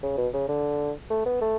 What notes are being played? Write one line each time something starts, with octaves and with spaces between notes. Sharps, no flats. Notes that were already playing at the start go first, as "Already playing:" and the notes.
C#3
B2
C#3
D3
A3
B3
A3